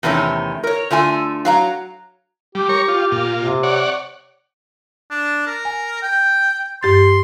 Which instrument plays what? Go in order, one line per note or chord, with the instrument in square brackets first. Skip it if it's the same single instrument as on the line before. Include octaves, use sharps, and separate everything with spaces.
[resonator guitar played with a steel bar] E2 C3 D#3 A3 C#4
A#4 C#5
D3 A3 F4 G#5
F#3 F5 A#5
[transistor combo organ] G3 [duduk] G4
[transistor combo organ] A#4 C#5 C#6
F4
A#2 F4
[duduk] C3
[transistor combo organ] C#5 D5 F#5
[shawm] D4
A#4
[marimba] G#5
[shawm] G5
[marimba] G2 G4 A6 [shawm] C6